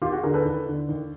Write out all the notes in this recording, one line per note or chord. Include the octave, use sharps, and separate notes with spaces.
D#2 F4 G4
F#4 G#4
D3 G#4 A#4
A4 B4
D#2
D3
D#2